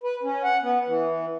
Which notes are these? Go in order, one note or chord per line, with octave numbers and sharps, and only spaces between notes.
B4
C#4
F#5
B3
E3